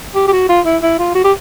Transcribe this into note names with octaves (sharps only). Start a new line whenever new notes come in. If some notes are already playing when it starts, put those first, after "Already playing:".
G4
G4
F#4
F4
E4
E4
F4
F#4
G4